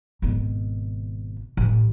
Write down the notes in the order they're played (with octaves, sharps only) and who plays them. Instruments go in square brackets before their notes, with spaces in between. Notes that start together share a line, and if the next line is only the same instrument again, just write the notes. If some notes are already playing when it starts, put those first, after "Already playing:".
[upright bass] G#1 B2
A1